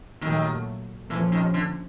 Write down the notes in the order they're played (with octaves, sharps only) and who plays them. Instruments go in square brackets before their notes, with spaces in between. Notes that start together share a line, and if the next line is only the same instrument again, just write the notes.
[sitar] D#2 D#3 [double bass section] A#2 F#3 A3
[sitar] E2 E3 [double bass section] A#2 F3 A3 C#4
[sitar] D#2 D#3
D3